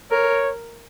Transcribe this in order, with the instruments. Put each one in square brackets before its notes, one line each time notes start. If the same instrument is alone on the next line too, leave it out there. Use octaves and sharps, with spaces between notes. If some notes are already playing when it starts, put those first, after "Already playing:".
[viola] A#4 [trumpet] C#5